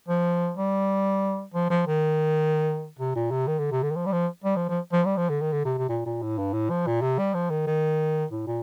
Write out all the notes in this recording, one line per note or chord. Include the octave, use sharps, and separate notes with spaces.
F3
G3
F3
F3
D#3
C3
A#2
C3
D#3
D3
C3
D3
D#3
F3
G3
F3
G3
F3
F3
F3
G3
F3
D3
D#3
D3
C3
C3
A#2
A#2
A2
G2
A2
F3
A#2
C3
G3
F3
D#3
D#3
A2
A#2